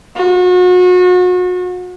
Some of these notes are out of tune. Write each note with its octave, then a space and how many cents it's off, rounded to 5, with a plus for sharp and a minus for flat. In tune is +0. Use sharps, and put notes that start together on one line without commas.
F#4 -35